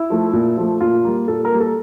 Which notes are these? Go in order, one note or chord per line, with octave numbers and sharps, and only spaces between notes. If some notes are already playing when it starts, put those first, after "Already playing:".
Already playing: E4
F3 A3
A#2
F3 A3
A#2 F4
G3 A#3
A#2 A4
A#4
G3 A#3
A4